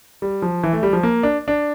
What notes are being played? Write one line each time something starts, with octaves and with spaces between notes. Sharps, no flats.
G3
F3
E3
A3
G3
F3
A#3
D4
D4